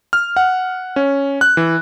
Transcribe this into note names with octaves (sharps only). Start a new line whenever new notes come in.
F6
F#5
C#4
F#6
E3